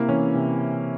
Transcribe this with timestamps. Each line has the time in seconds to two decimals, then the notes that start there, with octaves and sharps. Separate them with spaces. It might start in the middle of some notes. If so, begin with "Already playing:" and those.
Already playing: C3 A#3 E4
0.09 E3 C#4
0.35 C3